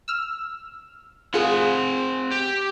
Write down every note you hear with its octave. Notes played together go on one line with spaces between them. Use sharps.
E6 F6
C4 F4 G#4 F#5
G4